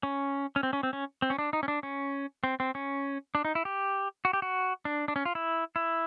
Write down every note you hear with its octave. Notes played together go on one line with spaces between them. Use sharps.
C#4
C#4
C4
C#4
C4
C#4
C4
C#4
D4
D#4
C#4
D4
C#4
C4
C4
C#4
D4
D#4
E4
G4
F#4
G4
F#4
D4
D4
C#4
F4
E4
E4